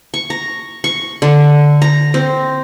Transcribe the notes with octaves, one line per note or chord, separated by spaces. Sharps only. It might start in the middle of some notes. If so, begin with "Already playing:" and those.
C#6
A#5
C#6
D3
A#5
C4